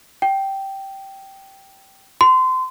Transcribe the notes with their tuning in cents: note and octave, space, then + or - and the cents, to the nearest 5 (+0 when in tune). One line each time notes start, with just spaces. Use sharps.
G5 -10
C6 -25